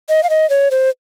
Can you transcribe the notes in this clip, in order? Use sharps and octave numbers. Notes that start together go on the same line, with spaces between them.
D#5
F5
D#5
C#5
C5